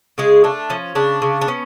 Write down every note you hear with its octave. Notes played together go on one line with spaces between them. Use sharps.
C#3 G#3 G#4
A3 D4
F3 C#4
C#3 D4
C#3
D4
B3 C#4